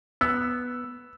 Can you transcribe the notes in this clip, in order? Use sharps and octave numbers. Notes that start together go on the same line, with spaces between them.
B3 E6